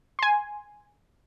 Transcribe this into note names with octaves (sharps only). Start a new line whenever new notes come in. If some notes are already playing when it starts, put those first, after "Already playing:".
G#5 C6